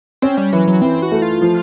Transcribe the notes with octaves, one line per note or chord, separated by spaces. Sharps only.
C4 C#4
G3
E3 F#3
F#3
E3 C4
F#4
A3
F4
F3